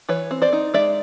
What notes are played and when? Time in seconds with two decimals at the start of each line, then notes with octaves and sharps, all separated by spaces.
0.09 E3 B4 C#5
0.31 C4
0.42 C5 D5
0.53 D#4
0.74 G#3 D5 E5